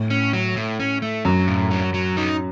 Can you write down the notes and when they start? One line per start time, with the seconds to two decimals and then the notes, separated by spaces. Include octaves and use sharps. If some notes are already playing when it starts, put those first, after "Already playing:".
Already playing: A2
0.10 C#4
0.33 F#3
0.56 A2
0.80 C#4
1.02 A3
1.25 F#2 F#3
1.48 A2
1.71 F#3
1.94 F#3
2.17 D#4